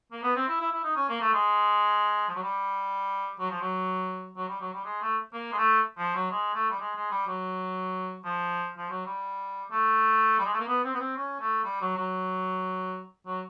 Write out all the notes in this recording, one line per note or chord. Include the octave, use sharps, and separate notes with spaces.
A#3
B3
C4
E4
E4
E4
D#4
C#4
A#3
A3
G#3
F3
F#3
G3
F#3
F3
F#3
F#3
G3
F#3
G3
G#3
A3
A#3
G#3
A3
F3
F#3
G#3
A3
G3
G#3
G#3
G3
F#3
F3
F3
F#3
G3
A3
G3
G#3
A3
A#3
B3
C4
B3
C4
C#4
A3
G3
F#3
F#3
F#3